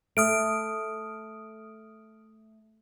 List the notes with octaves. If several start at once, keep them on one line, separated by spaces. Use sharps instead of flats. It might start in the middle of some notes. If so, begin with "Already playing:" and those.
A3 D#6 F6 D7